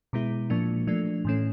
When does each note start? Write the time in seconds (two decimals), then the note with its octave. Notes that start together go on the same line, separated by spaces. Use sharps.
0.13 B2 G#3 B3 E4
0.50 A#2 F3 A#3 D4
0.87 F3 A3 D4
1.25 A2 E3 A3 C#4